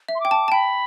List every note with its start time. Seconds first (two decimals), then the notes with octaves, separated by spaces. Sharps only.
0.09 E5
0.15 C6
0.20 G5 D6
0.31 A5
0.48 A5
0.52 G5 B5